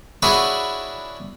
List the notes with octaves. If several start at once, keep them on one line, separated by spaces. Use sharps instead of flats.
D4 E4 F#4 G#4 B4 C#5